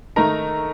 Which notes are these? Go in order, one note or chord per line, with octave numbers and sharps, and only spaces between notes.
D#3 A3 D#4 A#4 A#5